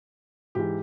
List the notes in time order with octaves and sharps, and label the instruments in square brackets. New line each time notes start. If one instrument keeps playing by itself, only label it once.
[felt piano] G#2 E3 G4